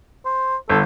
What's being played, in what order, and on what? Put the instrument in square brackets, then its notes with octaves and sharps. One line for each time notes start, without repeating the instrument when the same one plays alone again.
[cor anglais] C5
[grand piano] G1 [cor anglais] A4